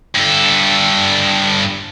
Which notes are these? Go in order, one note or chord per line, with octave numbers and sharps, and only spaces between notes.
G2 A4